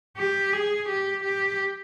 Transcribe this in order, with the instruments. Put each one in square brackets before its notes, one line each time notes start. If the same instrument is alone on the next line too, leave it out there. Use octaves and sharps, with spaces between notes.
[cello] G4
G#4
G4
G4